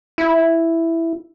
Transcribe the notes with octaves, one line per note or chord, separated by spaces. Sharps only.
E4